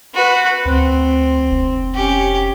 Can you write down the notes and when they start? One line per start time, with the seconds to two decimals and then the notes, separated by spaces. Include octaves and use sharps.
0.15 F#4 B4
0.65 D2 C4
1.51 F1
1.95 C#4 G4